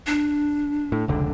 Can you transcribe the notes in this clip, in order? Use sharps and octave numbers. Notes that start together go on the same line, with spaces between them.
D4
A2
F1 C#2 D3